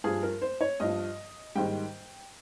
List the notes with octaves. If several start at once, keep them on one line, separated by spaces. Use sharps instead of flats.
G2 F3 G#4
A#4
C5
C#5
G2 F3 D#5
G#2 D#3 G3 G5